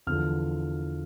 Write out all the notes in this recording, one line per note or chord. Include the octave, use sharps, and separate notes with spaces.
E2 D3 F3 F6